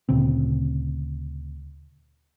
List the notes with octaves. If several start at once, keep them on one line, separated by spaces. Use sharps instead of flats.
D2 A#2 C#3 C4